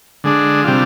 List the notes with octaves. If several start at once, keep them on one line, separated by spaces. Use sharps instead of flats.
D3 G#3 D4
C3 G3 D4 F4